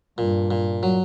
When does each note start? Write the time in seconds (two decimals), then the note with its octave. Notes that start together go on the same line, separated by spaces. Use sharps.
0.18 G2 A#2
0.51 A#2
0.83 F#3